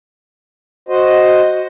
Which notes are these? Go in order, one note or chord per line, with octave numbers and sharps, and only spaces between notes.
F#4 C5 D#5